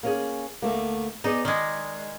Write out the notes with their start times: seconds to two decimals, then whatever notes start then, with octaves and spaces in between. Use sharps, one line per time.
0.03 A#3 C#4 G#4
0.62 D2 A3 A#3
1.24 B3 D#4 G#4 D5
1.45 D#3 G#3 D5